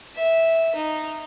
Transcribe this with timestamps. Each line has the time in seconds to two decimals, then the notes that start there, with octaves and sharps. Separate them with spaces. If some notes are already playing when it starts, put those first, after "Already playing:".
0.15 E5
0.75 D#4